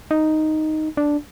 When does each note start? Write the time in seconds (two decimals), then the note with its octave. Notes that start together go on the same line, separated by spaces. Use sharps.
0.11 D#4
0.97 D4